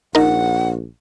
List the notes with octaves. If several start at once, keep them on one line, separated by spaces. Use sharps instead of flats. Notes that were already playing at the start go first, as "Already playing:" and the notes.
A#1 D#4 A#4 F#5